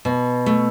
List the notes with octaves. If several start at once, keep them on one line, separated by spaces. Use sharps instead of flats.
B2
A3